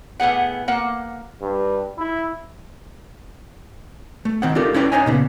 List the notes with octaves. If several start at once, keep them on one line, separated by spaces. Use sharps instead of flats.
A2 B3 G#4 F#5
A#3 F#5
G2
E4
A3
D#3 C4 F#5
D4 D#4 F4 G4 A4 A#4
C#4 E4 B4 D5 G5
C#4 D#4 C5 C#5 D#5 G#5
A#2 C#3 B3